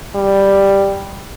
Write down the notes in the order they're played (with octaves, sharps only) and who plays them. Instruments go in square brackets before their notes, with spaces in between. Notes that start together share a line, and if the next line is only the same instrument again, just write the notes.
[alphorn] G3